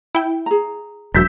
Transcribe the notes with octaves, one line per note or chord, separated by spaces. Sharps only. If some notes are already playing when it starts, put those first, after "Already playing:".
E4 G5
G#4 A#5
E1 F#3 E6 G6 B6